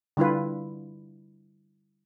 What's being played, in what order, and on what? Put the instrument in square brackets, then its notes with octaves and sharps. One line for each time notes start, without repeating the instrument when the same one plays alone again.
[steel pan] D3 G3 E4 F4 B4